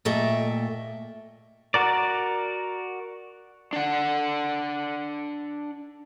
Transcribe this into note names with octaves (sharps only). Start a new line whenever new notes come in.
A#2 A3 A4 D#5 E5 G5
F#4 A#4 D5
D4 F#5